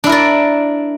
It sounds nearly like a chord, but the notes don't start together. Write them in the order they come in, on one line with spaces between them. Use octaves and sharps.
D4 E4 A#4 D5